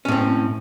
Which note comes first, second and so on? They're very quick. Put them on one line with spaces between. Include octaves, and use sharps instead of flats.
C#4 A2 C4